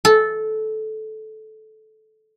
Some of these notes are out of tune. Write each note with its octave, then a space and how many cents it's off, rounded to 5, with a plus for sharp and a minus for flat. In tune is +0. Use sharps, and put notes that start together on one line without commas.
A4 -15